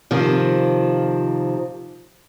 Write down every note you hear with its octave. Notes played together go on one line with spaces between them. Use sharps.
C3 D#3 F3